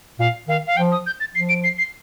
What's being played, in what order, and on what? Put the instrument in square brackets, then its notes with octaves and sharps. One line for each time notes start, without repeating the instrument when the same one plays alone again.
[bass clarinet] A#2 [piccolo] F5
[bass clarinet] D#3 [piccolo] F5
[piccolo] F5
[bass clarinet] F3 [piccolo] G5
[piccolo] D#6
G6
A6
[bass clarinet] F3 [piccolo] C7
[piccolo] D7
C7
C7